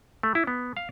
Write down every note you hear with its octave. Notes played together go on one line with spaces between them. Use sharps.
A3
E4
B3
F5